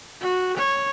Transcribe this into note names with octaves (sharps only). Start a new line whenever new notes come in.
F#4
C#5